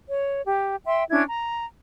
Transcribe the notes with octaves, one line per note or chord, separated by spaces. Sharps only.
C#5
G4
E5 G5 C6
C#4 D4 E4 G#6
A#5